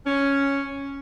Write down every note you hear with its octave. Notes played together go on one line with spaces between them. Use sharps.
C#4